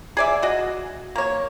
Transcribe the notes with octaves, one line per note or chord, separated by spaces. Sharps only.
G#4 D5 E5
F#4 D#5
A#3 C#5